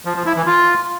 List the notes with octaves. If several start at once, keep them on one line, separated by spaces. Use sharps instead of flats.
F3
F3
E4
E3
F4